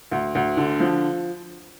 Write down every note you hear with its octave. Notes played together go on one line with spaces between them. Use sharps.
D2
D2
D3
F3